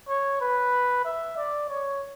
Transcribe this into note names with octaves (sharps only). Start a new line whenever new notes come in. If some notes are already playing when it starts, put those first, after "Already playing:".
C#5
B4
E5
D5
C#5